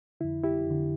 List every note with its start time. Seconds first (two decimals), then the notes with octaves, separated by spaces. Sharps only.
0.20 F2 D3 E4
0.43 E4 G4
0.67 F2 D3